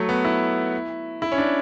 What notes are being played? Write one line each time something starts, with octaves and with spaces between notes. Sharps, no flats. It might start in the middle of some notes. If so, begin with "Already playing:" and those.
Already playing: F#3 A3
B3
E4
E4
C#4
D4